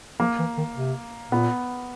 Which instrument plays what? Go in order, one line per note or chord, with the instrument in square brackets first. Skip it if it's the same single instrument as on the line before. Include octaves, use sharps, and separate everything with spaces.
[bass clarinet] F3 [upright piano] A#3
[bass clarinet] E3
D#3
C3
[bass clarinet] A#2 [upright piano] B3